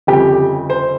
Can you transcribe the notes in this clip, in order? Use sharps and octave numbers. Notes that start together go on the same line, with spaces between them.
G1 F2 C#3 G4
C5